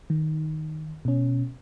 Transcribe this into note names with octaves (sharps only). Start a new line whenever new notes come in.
D#3
B2 C#4